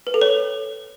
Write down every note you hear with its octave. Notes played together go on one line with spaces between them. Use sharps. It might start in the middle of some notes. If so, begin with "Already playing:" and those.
B4
A4
C#5